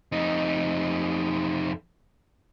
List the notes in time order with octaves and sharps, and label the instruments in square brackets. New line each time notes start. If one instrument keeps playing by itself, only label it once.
[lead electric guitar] F2 D#4